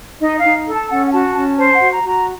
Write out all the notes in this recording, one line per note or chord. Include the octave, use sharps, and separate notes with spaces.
D#4 D#5
D#4 F5
A4
A5
C#4 F#5
F#5
F#4 A5
C#4 A5
C5 A5
F#5
F#4
A#5
F#4 A#5